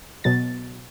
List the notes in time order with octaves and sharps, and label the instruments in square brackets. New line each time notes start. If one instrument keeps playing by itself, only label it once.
[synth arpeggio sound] B2 F#3 A6